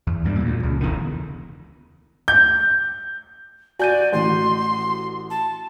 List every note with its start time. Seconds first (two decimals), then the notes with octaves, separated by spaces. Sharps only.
0.07 E2
0.24 E2 G2 G3
0.40 D2 A#2
0.63 C#2 C#3
0.80 E1 E2 D3 D#3
2.28 G6
3.79 F#4 D5 G#5 G6 D#7
4.13 A1 C6
5.30 A5